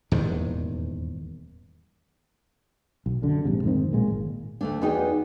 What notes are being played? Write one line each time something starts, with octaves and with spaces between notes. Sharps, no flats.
D#1 E2 G#2 D#3
B1
F#2 D3
A#1 G#2 C3
F1 G#2 D#3 C4
B1 A#2 G#3 A#3
G#1
D2 A3 D4
E2 B3 D#4 F#4 G#4 G5